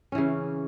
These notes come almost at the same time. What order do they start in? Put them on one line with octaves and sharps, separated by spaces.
C#4 E3 C#3